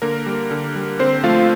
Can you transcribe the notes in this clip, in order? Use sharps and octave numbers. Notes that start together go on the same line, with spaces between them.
D3 A#3 A#4
G3
D3
G3
D3 C4 C5
F3 A3 F4 F5